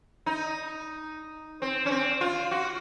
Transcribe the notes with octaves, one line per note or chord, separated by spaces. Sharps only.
D#4
C4
C#4
C4
F4
F#4